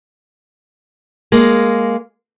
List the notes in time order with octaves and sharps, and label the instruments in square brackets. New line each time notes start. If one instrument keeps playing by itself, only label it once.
[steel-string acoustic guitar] G#3 A#3